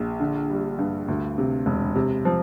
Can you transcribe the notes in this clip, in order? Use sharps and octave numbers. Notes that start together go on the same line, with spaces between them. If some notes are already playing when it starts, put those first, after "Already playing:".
Already playing: A#1
D3
G3
G2
D2
C3
E1
C3
F3